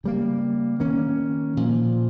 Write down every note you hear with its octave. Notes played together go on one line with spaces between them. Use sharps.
C#3 G3 A#3
D#3 A#3 C#4
A#2 F3 A#3